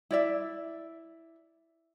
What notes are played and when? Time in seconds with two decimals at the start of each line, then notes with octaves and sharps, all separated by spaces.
0.11 E4 D5 E5